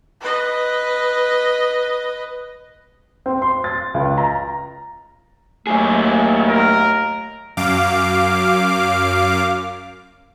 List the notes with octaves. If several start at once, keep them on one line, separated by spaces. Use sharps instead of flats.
B4 D#5
C4
C6
A6
C#2
A#5
D#2 A#2 F#3 A3 G#4
A#4
F#2 F5 D6